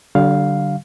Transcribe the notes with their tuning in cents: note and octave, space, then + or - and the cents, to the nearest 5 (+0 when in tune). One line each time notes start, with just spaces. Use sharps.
D3 -5 G3 -45 F5 +5